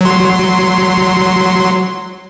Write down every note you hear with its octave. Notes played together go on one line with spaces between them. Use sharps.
F#3 C6